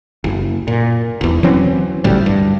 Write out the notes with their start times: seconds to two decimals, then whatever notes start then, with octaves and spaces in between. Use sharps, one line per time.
0.24 F#1
0.68 A#2
1.21 E1 E2
1.43 E3 F#3 C4 C#4
2.04 A1 D2 A2 G3
2.26 G2